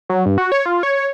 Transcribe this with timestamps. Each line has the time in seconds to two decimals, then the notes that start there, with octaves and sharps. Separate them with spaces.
0.09 F#3
0.26 G2
0.38 F#4
0.52 C#5
0.66 F4
0.83 C#5